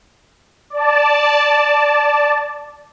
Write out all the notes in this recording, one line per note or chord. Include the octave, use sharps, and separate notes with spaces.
D5 A5